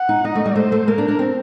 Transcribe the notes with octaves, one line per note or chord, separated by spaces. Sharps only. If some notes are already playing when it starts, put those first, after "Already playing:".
Already playing: F#5
D#4
D#4 D#5
A3
G3
A3 C5
A3
A#3 A#4
D4
D4
C4